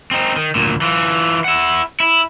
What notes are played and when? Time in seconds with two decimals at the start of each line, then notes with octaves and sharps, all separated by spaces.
0.11 C4 D#4
0.36 D#3
0.56 D2 A#2
0.81 E3 F4
1.45 E4 F#5
2.00 E4